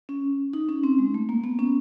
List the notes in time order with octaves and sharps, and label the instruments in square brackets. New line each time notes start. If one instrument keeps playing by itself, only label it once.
[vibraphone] C#4
D#4
C#4
C4
G#3
A3
A#3
B3
C#4